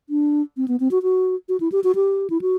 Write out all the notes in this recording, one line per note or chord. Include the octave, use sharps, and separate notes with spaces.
D4
C4
B3
C4
F#4
F#4
F#4
E4
G4
F#4
G4
E4
F#4